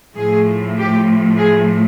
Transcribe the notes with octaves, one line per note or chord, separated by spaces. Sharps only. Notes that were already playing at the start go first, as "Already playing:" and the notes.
A2 F3 A3 G#4
G4
G#4